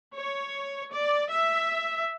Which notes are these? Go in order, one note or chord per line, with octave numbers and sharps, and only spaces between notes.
C#5
D5
E5